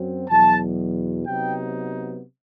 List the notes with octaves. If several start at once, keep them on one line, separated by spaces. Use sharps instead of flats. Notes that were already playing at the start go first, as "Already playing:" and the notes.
Already playing: F#2 F#3 C4
E2 B2 F#3 A5
C3 F#3 B3 D#4 G5